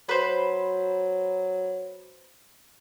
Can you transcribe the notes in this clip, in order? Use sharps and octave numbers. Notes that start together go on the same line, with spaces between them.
F#3 B4 C5